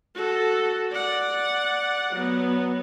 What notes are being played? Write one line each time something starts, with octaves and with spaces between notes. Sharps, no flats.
F#4 A4
D5 F#5
F#3 B3